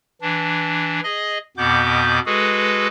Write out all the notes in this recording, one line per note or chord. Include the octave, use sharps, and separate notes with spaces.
E3 D4
G#4 D#5
F2 B2 B3 D6 G6
G#3 F#4 G#4 A4 B4